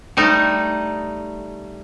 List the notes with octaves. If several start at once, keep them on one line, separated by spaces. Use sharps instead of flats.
G3 A3 D#4